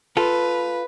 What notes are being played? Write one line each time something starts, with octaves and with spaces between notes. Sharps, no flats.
F4 A4 B4